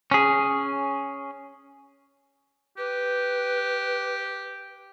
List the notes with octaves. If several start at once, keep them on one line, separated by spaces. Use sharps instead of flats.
C#4 G#4
G4 B4